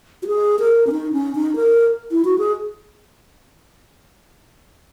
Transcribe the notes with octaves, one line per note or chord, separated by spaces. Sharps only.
F#4
G#4
A#4
C#4
D#4
C#4
D#4
A#4
E4
F#4
G#4